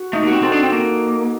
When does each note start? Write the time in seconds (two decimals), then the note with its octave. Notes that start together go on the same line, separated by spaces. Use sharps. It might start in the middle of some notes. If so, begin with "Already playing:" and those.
Already playing: F#4
0.13 A3 D#4
0.23 A#3
0.27 C4 F#4
0.42 C4 A4
0.52 D4
0.62 C4
0.72 A#3